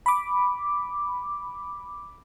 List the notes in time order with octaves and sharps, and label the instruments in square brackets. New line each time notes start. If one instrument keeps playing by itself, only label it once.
[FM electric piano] B5 D6